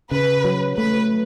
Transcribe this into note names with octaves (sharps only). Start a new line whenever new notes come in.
C#3 B4
F#3
A3 B4